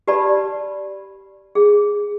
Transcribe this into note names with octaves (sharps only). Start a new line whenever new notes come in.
G4 B4 D5 A5 B5
G#4